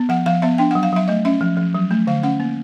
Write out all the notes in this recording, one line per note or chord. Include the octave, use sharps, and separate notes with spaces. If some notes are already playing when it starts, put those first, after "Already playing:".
Already playing: B3
F3 F#5
F3 F5
B3 E5
D4 G5
F#3 F#5
F5
F#3 E5
A3 D#5
C#4 E5
F3
F3
F#3
A3
D3 F5
C#4 F#5
A#3